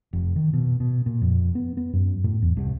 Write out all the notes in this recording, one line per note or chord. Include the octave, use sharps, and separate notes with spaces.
F1
D#3
B2
B2
A#2
F2
B3
B3
F#2
A2
E2
C2